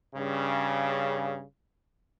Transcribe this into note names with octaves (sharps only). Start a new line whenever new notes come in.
G2 C#3